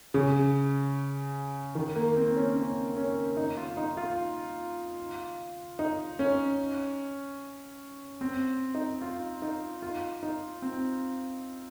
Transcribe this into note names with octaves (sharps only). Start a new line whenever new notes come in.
C#3
D#3
A#3
C4
C#4
C#4
C#4
D#4
F4
D#4
F4
D#4
C#4
C4
D#4
F4
D#4
F4
D#4
C4